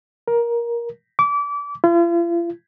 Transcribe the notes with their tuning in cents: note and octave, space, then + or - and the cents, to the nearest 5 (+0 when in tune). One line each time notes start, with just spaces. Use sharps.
A#4 +15
D6 -30
F4 -45